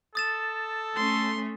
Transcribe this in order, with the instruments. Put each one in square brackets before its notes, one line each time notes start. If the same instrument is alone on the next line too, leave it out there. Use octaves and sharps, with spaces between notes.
[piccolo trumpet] A4 [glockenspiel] D#6 A6 E7
[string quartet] A3 C#4 [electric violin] C6